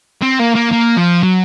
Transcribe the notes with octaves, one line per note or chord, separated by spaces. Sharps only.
C4
A#3
A#3
A#3
F3
F#3